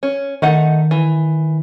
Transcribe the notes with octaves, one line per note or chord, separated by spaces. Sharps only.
C#4
D#3 A3 D#4 F#5
E3